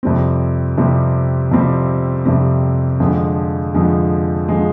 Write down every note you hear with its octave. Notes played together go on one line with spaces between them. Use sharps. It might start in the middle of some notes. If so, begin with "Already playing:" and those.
F2 C3 G3 C4
F2 C3 G3 C4
F2 C3 G3 C4
F2 C3 G3 C4
F2 D3 F3 G#3
F2 D3 F3 G#3
D3 F3 G#3